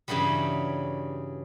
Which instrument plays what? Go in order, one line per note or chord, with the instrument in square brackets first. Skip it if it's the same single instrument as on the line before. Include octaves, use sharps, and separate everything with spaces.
[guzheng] G2 C#3 E3 F#3 G3